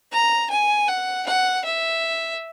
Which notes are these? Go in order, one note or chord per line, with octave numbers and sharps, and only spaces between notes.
A#5
G#5
F#5
F#5
E5